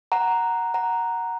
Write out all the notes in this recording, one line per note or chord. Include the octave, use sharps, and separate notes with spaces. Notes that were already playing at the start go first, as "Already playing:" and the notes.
F#5 A#5
F#5 A#5